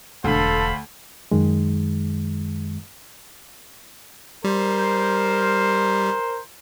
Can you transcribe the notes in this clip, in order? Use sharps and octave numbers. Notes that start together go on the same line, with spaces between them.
E1 D2 A4 C5 F5 B5
F#2 D#3 G#3
G3 A#4 C5